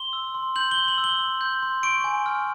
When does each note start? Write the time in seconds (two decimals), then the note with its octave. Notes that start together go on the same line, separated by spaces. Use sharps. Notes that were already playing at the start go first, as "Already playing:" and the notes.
Already playing: C6 G7
0.13 E6
0.35 C6
0.56 G6 F#7
0.71 G7
0.77 C6
0.88 F#7
0.98 E6
1.04 G7
1.20 C6
1.41 G6
1.62 C6
1.83 C#6 D7
2.04 G#5
2.26 F6